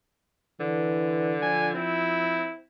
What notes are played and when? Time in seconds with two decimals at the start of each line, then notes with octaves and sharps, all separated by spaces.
0.60 D3 E3
1.42 F3 G#5
1.75 C4 E4